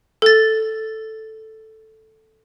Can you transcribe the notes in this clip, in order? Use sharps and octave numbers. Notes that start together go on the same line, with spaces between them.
A4 A6